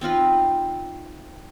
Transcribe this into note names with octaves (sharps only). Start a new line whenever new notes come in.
C4 D#4 F4 B4